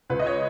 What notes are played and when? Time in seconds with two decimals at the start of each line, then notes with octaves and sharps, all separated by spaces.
0.10 C#2 B4
0.20 D#5
0.27 C#5